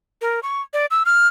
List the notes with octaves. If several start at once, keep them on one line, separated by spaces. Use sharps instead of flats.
A#4
C#6
D5
E6
F6